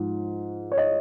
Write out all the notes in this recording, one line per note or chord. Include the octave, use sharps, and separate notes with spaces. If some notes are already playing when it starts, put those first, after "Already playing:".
Already playing: G#2 F3 G#3
C#5
D#5